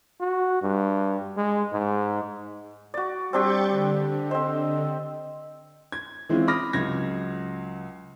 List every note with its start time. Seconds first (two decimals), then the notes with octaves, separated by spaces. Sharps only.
0.20 F#4
0.62 G2
1.37 G#3
1.72 G#2
2.94 F#4 D5
3.33 G3 C4 D4 G4 C#6 G6 A6
3.70 D3
4.31 C4 C5 D#5
5.92 G#6
6.29 E3 G#3 C4 C#4 E4 F4
6.48 B5 D6 D#6 F6 A#6
6.73 C#2 F#3 G#6 A#6